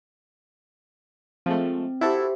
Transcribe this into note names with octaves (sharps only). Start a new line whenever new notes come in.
F3 G#3 A3 C4
E4 F#4 G4 A4 C5 E5